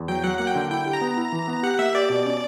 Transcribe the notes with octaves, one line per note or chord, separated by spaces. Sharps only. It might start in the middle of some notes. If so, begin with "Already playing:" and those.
Already playing: E2
F#3 G5
F#3 F#5
A#3 F#5
G5
D3
E4 G5
G4
A#5
B3
E4
E3
B3
G4 F#5
A#3 E5
G4 D5
B2
C#4